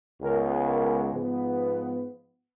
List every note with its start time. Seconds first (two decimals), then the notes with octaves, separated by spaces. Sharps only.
0.21 C#2 C#3 G#3 B3 A#4
0.66 A#4
1.12 G#2 F3 B3